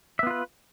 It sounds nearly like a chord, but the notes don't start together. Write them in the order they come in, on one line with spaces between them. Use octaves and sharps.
E5 B3 F4 B4